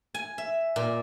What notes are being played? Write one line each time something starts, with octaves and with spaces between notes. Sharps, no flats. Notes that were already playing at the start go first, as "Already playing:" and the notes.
G#5
E5
A#2